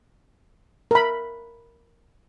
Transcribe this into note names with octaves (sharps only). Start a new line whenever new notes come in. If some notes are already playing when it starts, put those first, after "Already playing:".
A#4 B5